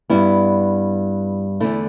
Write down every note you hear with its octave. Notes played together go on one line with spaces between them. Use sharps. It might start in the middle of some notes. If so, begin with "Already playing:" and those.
G2 G3 B3 E4
E2 D3 A3 E4